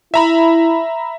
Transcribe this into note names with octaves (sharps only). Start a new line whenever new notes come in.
E4 E5 A#5 B5